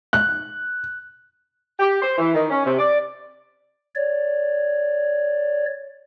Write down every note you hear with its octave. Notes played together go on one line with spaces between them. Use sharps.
F#6
G4
C5
E3
D#3
C#4
C3
D5
C#5 D5